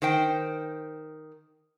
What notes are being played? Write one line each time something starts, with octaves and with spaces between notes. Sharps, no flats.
D#3 C5 G5